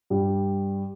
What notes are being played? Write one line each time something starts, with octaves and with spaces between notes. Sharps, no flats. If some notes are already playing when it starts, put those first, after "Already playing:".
G2 G3